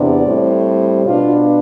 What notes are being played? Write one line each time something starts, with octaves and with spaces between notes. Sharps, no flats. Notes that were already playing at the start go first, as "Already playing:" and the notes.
Already playing: E2 C3 B3 D4 D5
A2 G3 C4
B2 B3 D4 F4